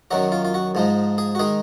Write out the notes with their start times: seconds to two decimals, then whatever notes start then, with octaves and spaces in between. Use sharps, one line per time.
0.11 F#2 D#3 F#3 F#4
0.32 F4
0.45 F4
0.54 F#4
0.75 G#2 F3 G#3 D#4
1.18 G#4
1.35 F#4
1.39 D#3 G#3 D#4 G#4